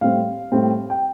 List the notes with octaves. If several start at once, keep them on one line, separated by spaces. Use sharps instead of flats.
A2 G3 C4 F5
A2 G3 C4
G5